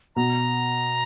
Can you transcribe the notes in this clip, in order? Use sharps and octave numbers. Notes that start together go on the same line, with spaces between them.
B2 A#5